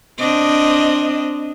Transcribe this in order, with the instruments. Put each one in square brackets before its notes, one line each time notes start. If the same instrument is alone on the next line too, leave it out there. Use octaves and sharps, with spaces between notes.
[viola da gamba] C4 D4 D#5